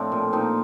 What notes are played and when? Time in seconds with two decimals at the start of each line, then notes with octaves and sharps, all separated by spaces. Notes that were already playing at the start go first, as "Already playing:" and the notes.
Already playing: A2 F3 C4 D4
0.12 A#2
0.33 A#2 C4 D#4